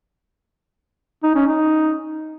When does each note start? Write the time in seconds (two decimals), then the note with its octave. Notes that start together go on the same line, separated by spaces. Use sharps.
1.23 D#4
1.35 C#4
1.47 D#4